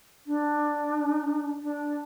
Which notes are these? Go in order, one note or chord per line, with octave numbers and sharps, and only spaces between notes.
D4
D4